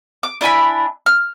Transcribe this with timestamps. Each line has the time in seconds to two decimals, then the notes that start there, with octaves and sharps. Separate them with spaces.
0.23 D6
0.41 D4 E4 G#5 B5
1.06 F6